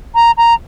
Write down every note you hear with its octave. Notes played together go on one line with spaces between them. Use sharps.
A#5
A#5